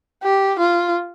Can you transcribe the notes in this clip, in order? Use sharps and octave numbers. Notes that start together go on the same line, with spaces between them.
G4
F4